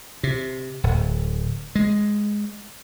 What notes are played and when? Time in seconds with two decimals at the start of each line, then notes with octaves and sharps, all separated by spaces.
0.23 C3
0.83 D1
1.75 G#3